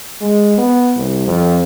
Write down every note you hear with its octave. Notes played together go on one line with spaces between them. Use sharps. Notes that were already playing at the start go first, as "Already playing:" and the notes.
G#3
B3
C2
F2